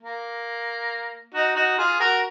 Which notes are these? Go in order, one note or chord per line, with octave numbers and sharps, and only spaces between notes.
A#3
D#4 F#4
D#4 F#4
F4 G#4
F#4 A#4